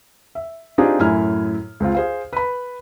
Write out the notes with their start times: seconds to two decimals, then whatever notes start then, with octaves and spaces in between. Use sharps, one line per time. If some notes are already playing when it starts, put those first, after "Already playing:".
0.35 E5
0.78 C4 D4 D#4 F4 G4 G#4
0.99 F#2 A2 E4 G#5 F6
1.80 C#2 C4 F4
1.95 G#4 C5 F5
2.33 B4 B5